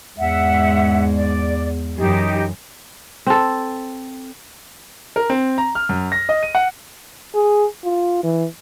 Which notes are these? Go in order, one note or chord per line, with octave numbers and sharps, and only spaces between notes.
E2 G#2 E5 F#5
D5
F#2 E3 D#4 G4
C4 A4
A#4
C4
A#5
F6
F#2
A#6
D#5
D#7
F#5
G#4
F4
E3